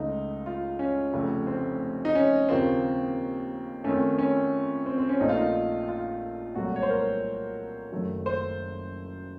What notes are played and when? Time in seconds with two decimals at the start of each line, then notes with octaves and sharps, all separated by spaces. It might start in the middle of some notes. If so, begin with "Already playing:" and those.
Already playing: C#2 C#3 A3 D#4
0.46 F4
0.79 C#4
1.13 F1 F2 C#3 A3
1.47 C4
2.05 D#4
2.15 C#4
2.49 D#2 C#3 F3 A#3 C4
3.84 F2 D#3 A3 C#4
4.18 C#4
4.86 C4
4.98 C4
5.09 C#4
5.20 A#1 A#2 A3 D#4
5.29 F4
5.38 D#4
5.88 F4
6.55 C2 A#2 F#3 A3 F#4
6.76 C#5
6.83 C5
6.90 A#4
7.92 F#1 F#2 D#3 A3
8.26 C5